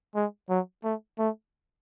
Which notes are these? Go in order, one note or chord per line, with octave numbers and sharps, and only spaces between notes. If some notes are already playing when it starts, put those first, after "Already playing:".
G#3
F#3
A3
A3